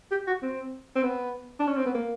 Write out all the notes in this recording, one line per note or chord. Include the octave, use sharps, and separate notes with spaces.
G4
F#4
C4
C4
B3
D4
C#4
C4
B3
A#3